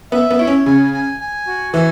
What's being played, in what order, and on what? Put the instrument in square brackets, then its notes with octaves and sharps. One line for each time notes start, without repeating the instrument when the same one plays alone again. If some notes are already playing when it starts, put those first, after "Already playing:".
[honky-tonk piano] B3 [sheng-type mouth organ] E5
[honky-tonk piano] B3
[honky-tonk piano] E4 [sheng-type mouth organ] C#5
[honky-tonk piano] C#4
[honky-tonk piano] C#3 [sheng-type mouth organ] G#5
[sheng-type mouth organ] G#5
G#5
F#4
[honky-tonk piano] E3 [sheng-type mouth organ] G#5